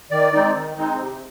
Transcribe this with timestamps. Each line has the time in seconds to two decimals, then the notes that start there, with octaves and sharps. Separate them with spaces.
0.11 D#3 D5
0.33 G#3 C4 D#4
0.55 D#3
0.77 G#3 C4 D#4
0.99 C3